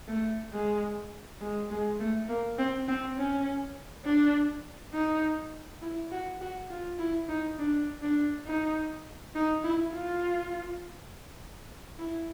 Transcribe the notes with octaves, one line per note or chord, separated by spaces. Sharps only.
A3
G#3
G#3
G#3
A3
A#3
C4
C4
C#4
D4
D#4
E4
F#4
F#4
F4
E4
D#4
D4
D4
D#4
D#4
E4
F4
E4